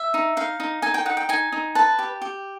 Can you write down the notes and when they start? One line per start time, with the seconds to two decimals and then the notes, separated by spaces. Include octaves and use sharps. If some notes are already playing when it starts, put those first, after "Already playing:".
Already playing: E5
0.14 D#4
0.37 D#4 F5
0.60 D#4
0.82 D#4 G#5
0.94 G5
1.06 D#4 F#5
1.17 G5
1.29 D#4 G#5
1.52 D#4
1.75 B4 A5
1.99 G4
2.22 G4